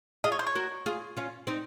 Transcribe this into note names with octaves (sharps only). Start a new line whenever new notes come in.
F4 G#4 D#5
C#5
C5
C#5
F#4 A#4
F4 G#4
C#4 F4
C4 D#4